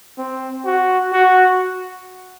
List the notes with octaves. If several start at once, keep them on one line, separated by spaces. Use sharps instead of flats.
C4
F#4
F#4